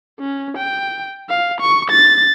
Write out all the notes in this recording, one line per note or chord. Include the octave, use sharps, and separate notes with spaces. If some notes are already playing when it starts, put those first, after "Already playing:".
C#4
G5
F5
C#6
A6